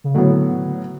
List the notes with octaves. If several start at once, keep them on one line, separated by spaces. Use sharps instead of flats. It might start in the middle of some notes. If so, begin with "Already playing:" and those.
C#3
A2 D3 F#3 B3